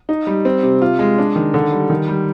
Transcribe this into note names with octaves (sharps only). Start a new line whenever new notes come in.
D#4
G3
C4
C3
F4
G#3
D4
D#3
D3
G3
D#3
G3